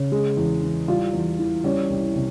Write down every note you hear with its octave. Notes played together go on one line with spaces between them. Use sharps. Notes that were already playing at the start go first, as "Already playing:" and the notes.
Already playing: C#3
G#3
E2
E3
G3 F4
E2
E3
G3 C#4
C2
C3